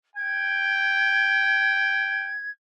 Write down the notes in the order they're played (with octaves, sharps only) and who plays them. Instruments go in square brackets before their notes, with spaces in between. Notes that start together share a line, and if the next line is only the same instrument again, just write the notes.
[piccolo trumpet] G5 [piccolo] G#6